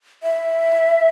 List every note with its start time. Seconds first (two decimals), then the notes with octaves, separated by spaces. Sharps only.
0.23 E5